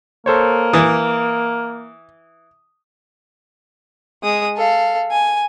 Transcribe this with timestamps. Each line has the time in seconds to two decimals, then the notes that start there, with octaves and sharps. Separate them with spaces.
0.26 A#3 A4 C5 C#5
0.73 E3 D#6
4.23 G#3 D#6
4.57 A4 F5
5.12 G#5